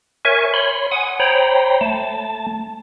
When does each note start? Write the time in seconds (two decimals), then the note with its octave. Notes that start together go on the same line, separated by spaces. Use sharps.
0.25 A#4 C#5 E5 G#5 C#6
0.54 C#5 B5 C6
0.92 F#5 G#5 D#6
1.20 C5 C#5 G5 A#5 B5
1.81 A3 A5